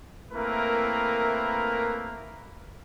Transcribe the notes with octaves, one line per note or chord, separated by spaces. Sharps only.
A3 A#3 C4 E4 A#4 B4